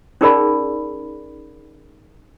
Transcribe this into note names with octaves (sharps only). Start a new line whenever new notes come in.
C#4 D#4 G#4 A#4 D5 B5